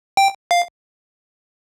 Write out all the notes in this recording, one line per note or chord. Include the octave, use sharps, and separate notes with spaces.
G5
F5